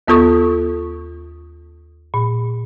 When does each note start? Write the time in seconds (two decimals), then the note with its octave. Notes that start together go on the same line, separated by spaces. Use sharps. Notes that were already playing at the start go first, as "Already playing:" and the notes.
0.08 D#2 B3 F4 A4 C#6 D#6
2.14 A#2